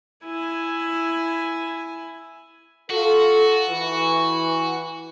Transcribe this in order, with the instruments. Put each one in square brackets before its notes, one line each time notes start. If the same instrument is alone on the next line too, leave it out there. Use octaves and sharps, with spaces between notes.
[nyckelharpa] E4 G#5
[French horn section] F4 A4 [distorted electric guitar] F#4
[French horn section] E3